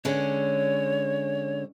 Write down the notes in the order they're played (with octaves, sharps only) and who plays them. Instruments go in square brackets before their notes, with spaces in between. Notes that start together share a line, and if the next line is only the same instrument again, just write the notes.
[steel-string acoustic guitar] D3 G#3 C#4 [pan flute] C#5